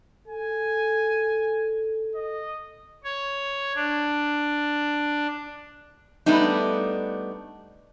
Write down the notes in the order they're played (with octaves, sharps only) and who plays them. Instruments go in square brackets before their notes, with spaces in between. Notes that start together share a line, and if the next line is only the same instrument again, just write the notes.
[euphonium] A4 [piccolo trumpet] G#5
[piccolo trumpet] D#5
[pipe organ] C#5
D4
[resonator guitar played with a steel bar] G3 A3 B3 D4 D#4